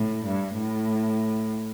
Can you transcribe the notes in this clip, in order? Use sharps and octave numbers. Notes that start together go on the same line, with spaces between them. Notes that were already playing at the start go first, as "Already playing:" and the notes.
Already playing: A2
G2
A2